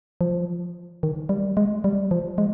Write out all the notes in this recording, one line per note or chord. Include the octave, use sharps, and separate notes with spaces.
F3
D#3
G3
G#3
G3
F3
G#3